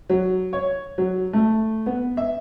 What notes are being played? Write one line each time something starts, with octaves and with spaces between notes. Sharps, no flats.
F#3
C#5
F#3
A3
B3
E5